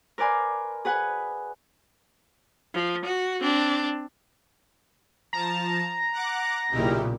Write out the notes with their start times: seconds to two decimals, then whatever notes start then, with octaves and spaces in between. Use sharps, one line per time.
0.18 A#4 B4 D5 G#5 C6
0.85 G#4 B4 F#5 G#5
2.74 F3
3.05 F#4
3.40 C4 D4
5.33 F3 A5 A#5
6.13 F#5 D6 F#6
6.71 B1 A#2 C#3 D#4 E4 G4